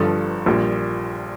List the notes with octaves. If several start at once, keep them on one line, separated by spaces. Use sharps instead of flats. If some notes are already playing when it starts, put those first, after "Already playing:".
Already playing: G1 G2 F3 A4
A#1 A#2 G3